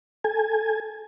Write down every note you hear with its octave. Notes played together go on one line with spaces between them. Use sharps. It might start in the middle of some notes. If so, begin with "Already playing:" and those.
A4 G#5